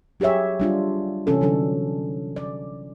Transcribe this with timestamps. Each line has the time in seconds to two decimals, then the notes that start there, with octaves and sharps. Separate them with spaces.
0.20 F#3 G4 G#4 C#5 E5
0.60 G3 D4 F4
1.27 C3 E3 C#4 A4
1.41 D3 F#3 D4 A4
2.36 D5